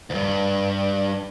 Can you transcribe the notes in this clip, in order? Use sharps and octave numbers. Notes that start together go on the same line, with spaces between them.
D2 G2